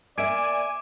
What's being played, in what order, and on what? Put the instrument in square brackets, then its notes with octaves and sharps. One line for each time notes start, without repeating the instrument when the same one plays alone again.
[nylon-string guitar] A#3 E5 [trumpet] D5 [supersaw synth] G#5 [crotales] D6 D7